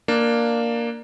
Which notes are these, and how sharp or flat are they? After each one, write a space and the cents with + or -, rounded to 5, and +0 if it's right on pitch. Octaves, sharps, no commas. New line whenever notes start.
A#3 +0 D4 +10 D5 +10